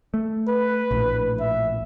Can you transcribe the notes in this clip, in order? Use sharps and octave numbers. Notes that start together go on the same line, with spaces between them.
A3
B4
A#1 A2
E5